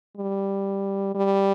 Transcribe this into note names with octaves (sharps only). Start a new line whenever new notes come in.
G3
G3